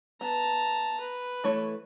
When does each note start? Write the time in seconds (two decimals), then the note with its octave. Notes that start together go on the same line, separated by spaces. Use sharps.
0.21 B3 A5 A#5
1.00 B4
1.44 E3 A3 C#5